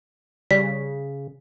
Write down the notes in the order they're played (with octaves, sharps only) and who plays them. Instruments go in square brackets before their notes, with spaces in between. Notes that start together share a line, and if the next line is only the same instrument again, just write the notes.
[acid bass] C#3 [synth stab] G3 [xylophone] B6